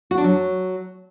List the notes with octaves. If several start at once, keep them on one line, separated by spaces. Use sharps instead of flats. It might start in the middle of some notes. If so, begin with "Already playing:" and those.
F#4
D4
F#3